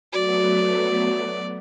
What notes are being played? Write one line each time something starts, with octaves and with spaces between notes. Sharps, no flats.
F#3 A3 B3 F#4 D5